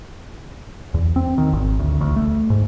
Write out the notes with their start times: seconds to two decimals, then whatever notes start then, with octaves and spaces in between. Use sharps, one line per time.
0.94 E2
1.16 C4
1.38 D#3
1.53 G#1
1.79 D2
2.01 D2
2.16 A3
2.50 G#2